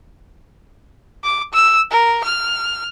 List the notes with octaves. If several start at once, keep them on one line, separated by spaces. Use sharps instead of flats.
D6
E6
A#4
F6